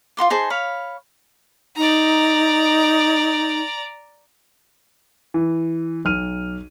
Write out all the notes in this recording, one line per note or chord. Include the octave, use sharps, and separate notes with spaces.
F4 F#4 C6 D6
D#4 G#4 C5 A5
C#5 F5 B5
D#4 D5 A#5
E3
B1 F6 D#7